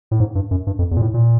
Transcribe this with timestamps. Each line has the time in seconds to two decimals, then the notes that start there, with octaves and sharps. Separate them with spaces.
0.11 A2
0.20 G#2
0.35 G2
0.51 F#2
0.67 G2
0.79 F2
0.91 E2
0.97 A#2
1.02 A2
1.14 A#2